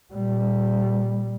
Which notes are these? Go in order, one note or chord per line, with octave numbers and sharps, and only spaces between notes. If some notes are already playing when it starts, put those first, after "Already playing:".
A#2 G3